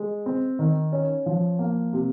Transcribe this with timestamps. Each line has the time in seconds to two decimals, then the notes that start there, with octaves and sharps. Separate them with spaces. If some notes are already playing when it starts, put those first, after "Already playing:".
Already playing: G#3
0.26 C4
0.59 D#3
0.92 C#4
1.26 F3
1.59 A#3
1.93 C3